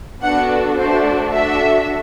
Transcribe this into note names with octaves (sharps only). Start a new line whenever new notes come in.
B3 D4 F#4 A4 F#5
A3 D4 F#4 A4 C5
D4 F#4 A4 E5